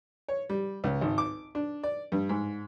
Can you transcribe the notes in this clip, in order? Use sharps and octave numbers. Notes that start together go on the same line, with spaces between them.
C#5
G3
C#2
G#1
D6
D4
D5
G2
G#2